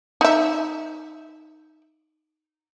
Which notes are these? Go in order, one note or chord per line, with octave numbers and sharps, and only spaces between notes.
D#4 E5